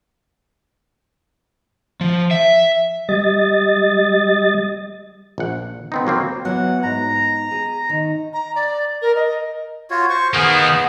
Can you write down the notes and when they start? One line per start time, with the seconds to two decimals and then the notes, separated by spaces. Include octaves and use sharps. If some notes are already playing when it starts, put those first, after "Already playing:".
2.01 F3
2.31 E5
3.09 G3 D#5 A6
5.38 A#1 F#5
5.92 B3 C4 D#4
6.07 F#3 A#3 C4
6.45 E3 F#3 B3 F#5
6.83 G#2 A#5
7.51 G#4
7.89 D#3
8.33 A#5
8.55 D5
9.02 A#4
9.15 D#5
9.90 F4 F#4 C#5
10.10 C5 C#6
10.34 D#3 A#3 B3 G#4